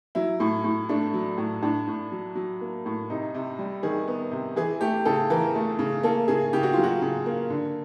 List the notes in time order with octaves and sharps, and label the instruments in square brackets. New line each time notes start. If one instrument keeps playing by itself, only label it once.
[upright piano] F#3 E4
A2
A2
A3 D4
F#3
A2
A2 D4
A2
F#3
F#3
A#3
A2
C3 D#4
C3
G3
D#3 G#4
B3
C3
E3 G#4
A3 G4
C#3 A4
E3 A#4
A3
C#3
A#3 A4
C#3 G#4
C#3 G4
F#4
F#3 F4
F#4
C#3
A#3
D3